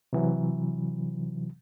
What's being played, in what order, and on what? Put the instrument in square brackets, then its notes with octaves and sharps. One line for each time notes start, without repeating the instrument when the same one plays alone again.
[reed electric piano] C3 E3 F#3